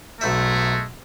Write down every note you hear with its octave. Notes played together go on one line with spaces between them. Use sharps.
B1 G#3 A3 E5